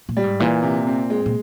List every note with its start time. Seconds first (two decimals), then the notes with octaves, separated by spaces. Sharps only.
0.09 A#2
0.17 G3
0.24 G#2
0.40 A#2 E3
0.63 C3
0.87 C4
1.10 G#3
1.26 A#2